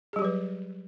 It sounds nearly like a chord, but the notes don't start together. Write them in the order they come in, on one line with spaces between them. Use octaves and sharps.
G#4 G3 G4 F#3 B4